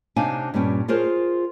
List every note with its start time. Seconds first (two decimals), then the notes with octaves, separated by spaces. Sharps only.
0.16 C3 D4 D#4 C#5 F5 G#5
0.54 G2 A#2 G3 C#4 G5
0.88 F4 G#4 A#4 C5 C#5